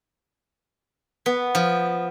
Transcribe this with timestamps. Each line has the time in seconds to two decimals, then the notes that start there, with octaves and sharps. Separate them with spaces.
1.26 B3
1.55 F3